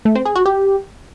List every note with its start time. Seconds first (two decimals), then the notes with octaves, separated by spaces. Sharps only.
0.05 A3
0.15 C4
0.25 G#4
0.36 F#4
0.46 G4